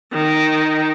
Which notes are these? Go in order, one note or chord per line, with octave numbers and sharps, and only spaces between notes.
D#3